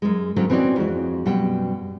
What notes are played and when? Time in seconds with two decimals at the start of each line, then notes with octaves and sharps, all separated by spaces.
0.02 F#2 G#3
0.36 D3 D#3 F#3 A#3 C4 C#4
0.50 E3 C4 C#4 D#4 F#4 D5
0.76 F2 G#3 F#4
1.26 F#2 B2 G3 F#5 G5